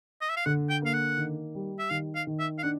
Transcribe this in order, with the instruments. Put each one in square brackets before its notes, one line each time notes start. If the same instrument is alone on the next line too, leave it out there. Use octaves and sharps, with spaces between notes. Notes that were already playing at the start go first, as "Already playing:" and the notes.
[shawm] D#5
E5
F5
[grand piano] D3 [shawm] F#5
[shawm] G5
[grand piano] A#3 [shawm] F5
[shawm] F#5
[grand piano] D#3
G3
[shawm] E5
[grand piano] D#3 [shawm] F5
[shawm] F5
[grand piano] D#3
[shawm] E5
F5
[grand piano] D4 [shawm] F#5